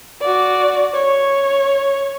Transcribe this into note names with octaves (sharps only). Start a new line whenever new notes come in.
F#4 D5
C#5